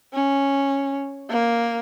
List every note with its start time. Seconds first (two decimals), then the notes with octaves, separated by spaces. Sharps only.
0.13 C#4
1.30 A#3